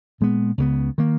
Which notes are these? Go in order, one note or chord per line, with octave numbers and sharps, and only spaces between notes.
A#2 G#3 B3
C#2 C#3 F3 B3
D#3 A#3